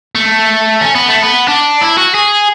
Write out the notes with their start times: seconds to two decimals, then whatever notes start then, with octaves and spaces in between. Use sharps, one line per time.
0.15 A3
0.81 C#4
0.95 B3
1.08 A3
1.22 B3
1.48 D4
1.81 E4
1.98 F#4
2.15 G#4